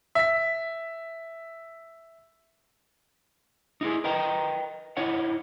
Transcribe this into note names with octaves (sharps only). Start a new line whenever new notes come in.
E5 B6
D#4 E4 G#4
A#4 B4 D#5 G5 A#5
D#4 E4 C#5 F#5